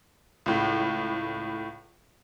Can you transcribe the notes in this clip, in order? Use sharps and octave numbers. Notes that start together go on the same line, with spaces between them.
C#2 A2